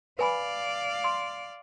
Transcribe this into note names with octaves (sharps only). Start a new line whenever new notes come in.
B4 D5 F5 G#5 B5
C6